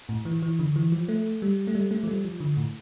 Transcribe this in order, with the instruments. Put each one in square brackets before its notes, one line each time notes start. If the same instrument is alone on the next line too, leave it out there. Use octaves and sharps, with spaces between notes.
[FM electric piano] A2
E3
E3
D3
E3
F3
A3
G3
A3
G3
A3
F3
G3
F3
D3
A2